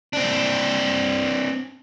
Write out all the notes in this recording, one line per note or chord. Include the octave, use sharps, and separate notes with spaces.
C4 D4